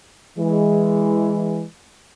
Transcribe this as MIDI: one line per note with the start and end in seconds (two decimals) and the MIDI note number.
0.38 1.63 52
0.38 1.63 56